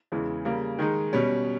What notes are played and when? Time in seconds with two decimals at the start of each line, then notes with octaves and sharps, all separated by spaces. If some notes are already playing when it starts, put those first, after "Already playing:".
0.12 E2 C#3 E3 G#3
0.45 C#3 G3 A#3
0.79 D#3 G#3 D#4
1.13 B2 G3 C#4